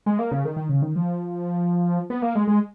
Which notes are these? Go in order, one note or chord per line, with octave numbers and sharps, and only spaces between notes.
G#3
A#3
C#3
D#3
D#3
C#3
D#3
F3
B3
A#3
G#3
G#3